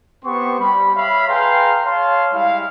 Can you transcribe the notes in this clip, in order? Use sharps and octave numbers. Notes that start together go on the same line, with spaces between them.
B3 C4 G4 C5 C6 C#6
G3 B5
C#5 E5 F5 B5
G#4 B4 F5 G5 A#5 C6
C#5 F5 A5 C6
G3 G#3 E4 F5